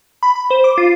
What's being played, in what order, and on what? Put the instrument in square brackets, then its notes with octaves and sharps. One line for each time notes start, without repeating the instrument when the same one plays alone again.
[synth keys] B5
B5
C5
D6
F4